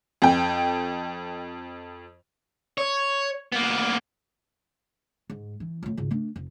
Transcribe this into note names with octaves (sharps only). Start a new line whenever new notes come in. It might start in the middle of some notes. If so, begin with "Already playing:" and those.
F2 G5
C#5
A#3 B3
G#2
E3
F2 A2
G#1 C#2
A3 D4
F1